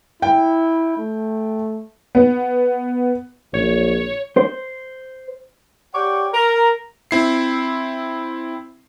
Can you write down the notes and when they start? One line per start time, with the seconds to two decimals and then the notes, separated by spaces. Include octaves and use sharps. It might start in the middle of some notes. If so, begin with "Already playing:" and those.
0.22 E4 G5
0.97 A3
2.15 B3
3.54 A#1 C#5
4.37 C5
5.94 G4 C#5 D5 F#5 G5
6.32 A#4
7.11 C4 E4 C7